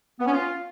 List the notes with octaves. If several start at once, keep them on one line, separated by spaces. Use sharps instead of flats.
B3
C#4
F4